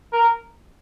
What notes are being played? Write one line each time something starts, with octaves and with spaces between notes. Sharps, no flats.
A#4